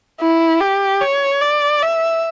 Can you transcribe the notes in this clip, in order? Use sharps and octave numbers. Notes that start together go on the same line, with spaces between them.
E4
G4
C#5
D5
E5